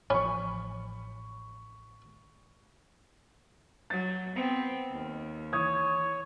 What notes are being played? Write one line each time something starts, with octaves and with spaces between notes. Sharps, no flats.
A1 F3 C#4 B5 C#6
F#3 A6
B3 C4
D#2
E3 C#5 D#6 G#6